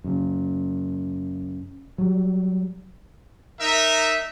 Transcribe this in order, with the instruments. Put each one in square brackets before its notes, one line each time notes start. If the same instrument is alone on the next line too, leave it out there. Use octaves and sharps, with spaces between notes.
[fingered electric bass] F#2 C#3
F#3 G3
[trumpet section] D#4 A#4 E5